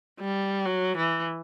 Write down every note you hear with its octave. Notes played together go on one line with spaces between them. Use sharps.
G3
F#3
E3